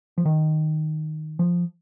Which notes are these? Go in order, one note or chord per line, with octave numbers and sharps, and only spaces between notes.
F3
D#3
F3